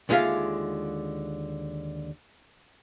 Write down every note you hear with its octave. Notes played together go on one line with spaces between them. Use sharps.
D#2 D3 G#3 F4 E5 F5